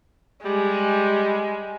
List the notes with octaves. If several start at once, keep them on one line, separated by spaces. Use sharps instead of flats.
G3 G#3